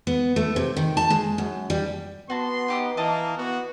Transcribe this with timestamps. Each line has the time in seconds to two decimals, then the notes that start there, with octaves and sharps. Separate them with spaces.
0.07 B3
0.36 A3
0.56 C3
0.77 D#3
0.97 A5
1.10 G#3
1.38 F#2
1.70 G3
2.30 B3 F#4 A5 C6
2.68 D#4 G4 D#6
2.97 E3 A#3 D#5 A5 D#6
3.38 B3 F#4